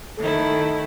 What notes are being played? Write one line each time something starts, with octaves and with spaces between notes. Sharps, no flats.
D#3 A3 E4 A4